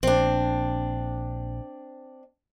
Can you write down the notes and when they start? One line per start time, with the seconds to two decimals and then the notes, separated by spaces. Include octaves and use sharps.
0.03 A#1 C4 D4